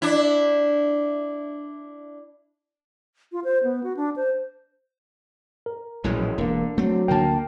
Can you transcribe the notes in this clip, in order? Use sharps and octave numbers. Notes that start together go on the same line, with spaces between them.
D4 E4
F4
C5
B3
F#4
D4
C5
A#4
A#1 A2 E3 F#3 G#3 C#4
E1 D3 A#3
F#3 A3 C4
D2 D3 A#3 G5 A5